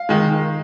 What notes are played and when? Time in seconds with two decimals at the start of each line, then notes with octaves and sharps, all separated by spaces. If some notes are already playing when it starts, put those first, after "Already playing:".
Already playing: F5
0.09 D#3 G#3